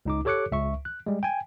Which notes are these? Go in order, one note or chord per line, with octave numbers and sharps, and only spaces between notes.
C#2 D#4 D6
G4 A4 C#5 D6 F#6 C#7
C#2 E5 C#6
F#6
G3 G#3
G5 G#5